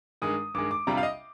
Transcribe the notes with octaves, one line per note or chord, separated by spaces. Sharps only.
G2 D#3 G#3 D#6
G2 D#3 G#3 D6
D6
C3 G3 D4 F4 A#5
F5
D#5